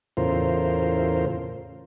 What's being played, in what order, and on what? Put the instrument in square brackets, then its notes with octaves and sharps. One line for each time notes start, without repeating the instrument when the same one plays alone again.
[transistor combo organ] E2 A2 C#3 F4 A#4 C5